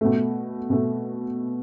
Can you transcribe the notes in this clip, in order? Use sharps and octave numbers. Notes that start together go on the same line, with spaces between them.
B2 A3
B2 A3